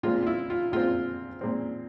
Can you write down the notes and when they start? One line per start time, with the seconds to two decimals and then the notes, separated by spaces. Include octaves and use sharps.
0.03 A#2 G#3 C4 F4
0.22 F4
0.27 E4
0.50 F4
0.72 A#2 G#3 C4 F4
1.41 A#2 G#3 C4